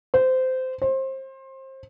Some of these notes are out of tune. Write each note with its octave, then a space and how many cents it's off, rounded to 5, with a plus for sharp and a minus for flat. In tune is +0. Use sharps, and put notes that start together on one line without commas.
C5 -20
C5 +25